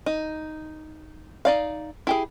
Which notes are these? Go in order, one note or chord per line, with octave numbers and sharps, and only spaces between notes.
D#4
D#4 D5 F5
E4 G4 G#4